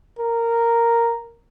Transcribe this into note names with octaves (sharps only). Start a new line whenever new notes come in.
A#4